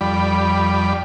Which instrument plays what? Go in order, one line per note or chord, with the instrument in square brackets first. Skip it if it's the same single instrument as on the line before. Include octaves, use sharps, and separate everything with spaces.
[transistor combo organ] F2 G3 D5 B5